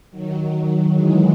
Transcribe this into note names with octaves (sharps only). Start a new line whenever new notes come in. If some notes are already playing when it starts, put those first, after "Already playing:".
D#3 F#3
E3 G#3